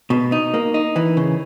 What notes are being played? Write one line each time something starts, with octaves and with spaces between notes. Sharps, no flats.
B2
D#4
A#3
D#4
E3
C#3